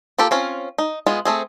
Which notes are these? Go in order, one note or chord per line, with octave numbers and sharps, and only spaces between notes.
A#3 F4 G4 A4
C4 C#4 F4
D#4
G#3 B3 F4 G#4
A3 C4 G#4